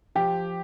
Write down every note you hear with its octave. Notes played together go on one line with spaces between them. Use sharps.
F3 G4